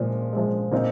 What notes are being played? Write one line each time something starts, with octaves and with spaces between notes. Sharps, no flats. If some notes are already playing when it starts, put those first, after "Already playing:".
Already playing: A#2 F3 G#3
F3 G#3
A#2 C4 D#4